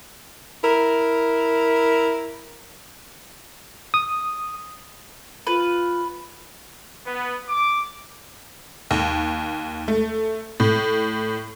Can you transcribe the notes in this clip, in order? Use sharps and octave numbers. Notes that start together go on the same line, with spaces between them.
E4 A#4
D#6
F4 B4
B3
D6
D#2
A3
A2